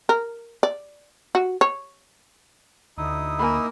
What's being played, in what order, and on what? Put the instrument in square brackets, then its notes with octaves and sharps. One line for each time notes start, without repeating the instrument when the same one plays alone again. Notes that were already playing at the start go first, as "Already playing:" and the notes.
[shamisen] A#4
D5
F#4
C#5
[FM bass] D2 [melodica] D#4 E4 D#6
[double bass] A#3 [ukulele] G#5 B5